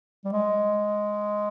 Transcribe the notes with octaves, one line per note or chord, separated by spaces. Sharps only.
G3
G#3